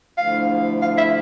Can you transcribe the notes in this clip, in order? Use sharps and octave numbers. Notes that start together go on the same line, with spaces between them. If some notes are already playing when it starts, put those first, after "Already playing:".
D2 D3 F3 A3 E4 F5
F5
E5